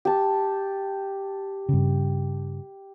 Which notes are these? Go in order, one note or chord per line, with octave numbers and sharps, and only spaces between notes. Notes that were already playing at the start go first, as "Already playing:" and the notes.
G4 A5
G2 C#3